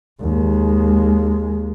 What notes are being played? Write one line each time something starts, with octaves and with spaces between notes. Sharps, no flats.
D#2 G#3